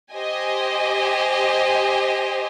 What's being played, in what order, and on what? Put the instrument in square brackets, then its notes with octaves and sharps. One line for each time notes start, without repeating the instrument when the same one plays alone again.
[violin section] G4 C5 D#5 G#5